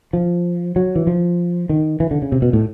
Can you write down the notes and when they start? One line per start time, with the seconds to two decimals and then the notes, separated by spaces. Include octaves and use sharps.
0.13 F3
0.76 F#3
0.96 E3
1.07 F3
1.69 D#3
2.00 E3
2.11 D3
2.22 C#3
2.32 C3
2.42 B2
2.53 A2